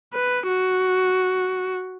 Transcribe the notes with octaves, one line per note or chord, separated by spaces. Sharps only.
B4
F#4